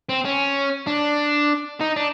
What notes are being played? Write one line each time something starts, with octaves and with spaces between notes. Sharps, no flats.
C4
C#4
D4
D#4
D4